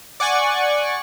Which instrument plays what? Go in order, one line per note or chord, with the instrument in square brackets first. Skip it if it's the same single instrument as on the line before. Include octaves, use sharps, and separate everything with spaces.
[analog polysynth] D5 F#5 G#5 C#6